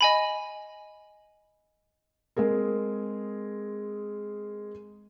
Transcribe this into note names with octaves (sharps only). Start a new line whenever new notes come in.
D#5 G#5 B5
G#3 C4 G#4 A#4